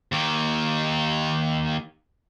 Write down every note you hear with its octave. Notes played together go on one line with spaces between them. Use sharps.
D#2 D#3